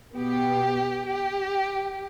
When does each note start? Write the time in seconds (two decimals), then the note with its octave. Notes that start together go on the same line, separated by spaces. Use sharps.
0.16 B2 B3 G4
1.08 G4